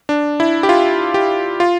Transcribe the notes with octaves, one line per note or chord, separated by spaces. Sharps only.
D4
E4
G4
F4
G4
F4